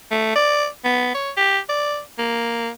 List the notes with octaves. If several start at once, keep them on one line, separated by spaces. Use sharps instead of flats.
A3
D5
B3
C#5
G4
D5
A#3